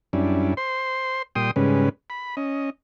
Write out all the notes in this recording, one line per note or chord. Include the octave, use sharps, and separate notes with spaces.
F#2 G3 C#4 D4 E4
C5 C6
A#2 G3 G5 C6 D#6
G#2 C#3 G3 G#3 C#4 B4
B5
C#4 D#5